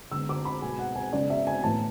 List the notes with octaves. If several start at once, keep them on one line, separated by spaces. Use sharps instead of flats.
D3 G#3 B3 E6
D6
B5
B2 G#3 B3 G#5
F#5
G#5
C#3 G#3 B3 D5
E5
G#5
A2 E3 B3 A5